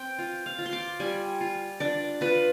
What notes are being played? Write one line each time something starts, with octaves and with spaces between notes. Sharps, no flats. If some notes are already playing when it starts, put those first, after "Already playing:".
Already playing: C4 G5
F4
F5
F4
C6
D6
G3 G#5
F4
D4 D5
F4 B4